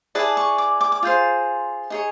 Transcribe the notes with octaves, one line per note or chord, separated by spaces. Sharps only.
E4 G#4 B4 D5 A5
C#6
D6
D6
D6
F4 G#4 C5
D#4 G#4 C#5